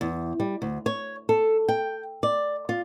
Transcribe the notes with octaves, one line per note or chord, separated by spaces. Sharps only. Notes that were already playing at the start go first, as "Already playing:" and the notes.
E2
G3
D2
C#5
A4
G5
D5
F4